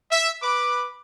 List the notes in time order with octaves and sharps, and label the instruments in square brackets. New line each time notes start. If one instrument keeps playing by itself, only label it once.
[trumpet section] E5
B4 D6